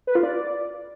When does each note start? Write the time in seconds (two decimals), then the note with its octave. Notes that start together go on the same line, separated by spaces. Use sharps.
0.07 B4
0.15 F4
0.23 D5